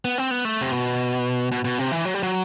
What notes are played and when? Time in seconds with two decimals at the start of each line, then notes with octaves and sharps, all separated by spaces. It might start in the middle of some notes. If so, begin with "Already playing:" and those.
0.05 B3
0.18 C4
0.31 B3
0.45 A3
0.61 C3
0.72 B2
1.52 B2
1.64 B2
1.79 C3
1.92 E3
2.05 F#3
2.14 G3
2.23 F#3